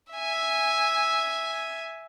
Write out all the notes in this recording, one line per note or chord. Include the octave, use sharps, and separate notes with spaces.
E5 G#5